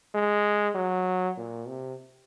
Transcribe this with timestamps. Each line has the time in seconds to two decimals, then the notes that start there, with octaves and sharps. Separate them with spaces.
0.15 G#3
0.75 F#3
1.37 A#2
1.68 C3